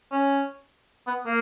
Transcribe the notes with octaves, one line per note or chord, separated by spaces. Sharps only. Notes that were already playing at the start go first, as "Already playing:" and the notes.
C#4
B3
A#3